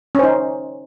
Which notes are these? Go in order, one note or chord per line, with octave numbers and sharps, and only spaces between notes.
C#4 D#4 C5